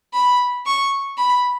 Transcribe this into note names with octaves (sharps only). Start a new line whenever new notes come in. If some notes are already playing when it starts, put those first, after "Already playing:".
B5
C#6
B5